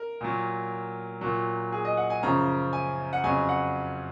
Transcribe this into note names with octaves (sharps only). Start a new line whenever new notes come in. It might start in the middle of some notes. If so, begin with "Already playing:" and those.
Already playing: A#4
A#2 F#3
A#2 F#3
G#4
D#5
F#5
G#5
F#2 C#3 F3 A#5
G#5
F#5
F2 C#3 F#3 G#5
F#5